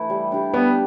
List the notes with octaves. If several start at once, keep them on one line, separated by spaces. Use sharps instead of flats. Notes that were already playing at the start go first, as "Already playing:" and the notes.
Already playing: E3 A3 E4
G3
D4 G4
G3 B3